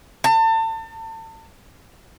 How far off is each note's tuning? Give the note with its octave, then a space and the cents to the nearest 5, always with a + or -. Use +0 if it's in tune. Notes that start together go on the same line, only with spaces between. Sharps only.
A5 +35